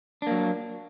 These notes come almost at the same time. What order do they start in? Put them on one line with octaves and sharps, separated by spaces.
D4 A#3 F#3